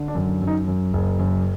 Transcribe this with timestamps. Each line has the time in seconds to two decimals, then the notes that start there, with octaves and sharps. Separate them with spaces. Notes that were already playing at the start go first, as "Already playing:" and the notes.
Already playing: D3
0.08 D4
0.15 F#2
0.42 F#2
0.47 D#4
0.67 F#2
0.93 F#1
1.19 F#2